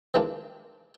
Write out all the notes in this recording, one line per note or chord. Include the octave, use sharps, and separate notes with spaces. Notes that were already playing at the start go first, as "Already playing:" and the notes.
D#3 E3 G#3 A#3 D4 F4